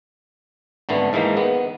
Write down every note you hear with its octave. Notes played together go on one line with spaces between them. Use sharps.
G#1 D3 A3 B3
G#2 E3 G#3 A#3 D#4
D#3 B3